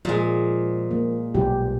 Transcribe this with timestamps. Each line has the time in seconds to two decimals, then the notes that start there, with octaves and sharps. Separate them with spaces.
0.05 A#2 F3 G#3
0.91 A#3
1.35 B1 G#2 G4